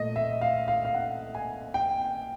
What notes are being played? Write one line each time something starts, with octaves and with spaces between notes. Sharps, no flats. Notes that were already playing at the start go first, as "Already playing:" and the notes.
Already playing: A#2 A3 D#5
E5
F5
F5
F5
F#5
G#5
G5